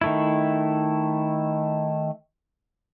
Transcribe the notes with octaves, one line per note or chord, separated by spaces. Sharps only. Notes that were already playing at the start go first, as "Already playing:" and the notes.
D#3 A3 E4